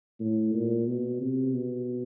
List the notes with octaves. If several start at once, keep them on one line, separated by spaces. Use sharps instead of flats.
A2
A#2
B2
C3
B2